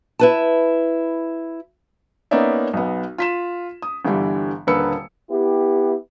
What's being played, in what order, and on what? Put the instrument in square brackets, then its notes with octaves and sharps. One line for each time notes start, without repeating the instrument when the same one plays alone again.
[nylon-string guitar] E4 B4 A5
[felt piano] A#3 B3 C#4 D#4 D5 E5
B1 B3
F4 B6 E7
D#6
G1 D3 E3 G3
D#1 D3 A#3 B4 E6 C#7
[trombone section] B3 E4 G4